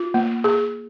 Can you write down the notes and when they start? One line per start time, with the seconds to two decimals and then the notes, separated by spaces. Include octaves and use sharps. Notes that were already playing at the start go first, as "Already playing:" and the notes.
Already playing: F4
0.14 A#3
0.44 G#4